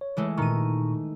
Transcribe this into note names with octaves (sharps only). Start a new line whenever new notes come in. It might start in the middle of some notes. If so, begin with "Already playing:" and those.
C#5
E3 G#3 A3
A#2 D#3 A#5 C#6 D#7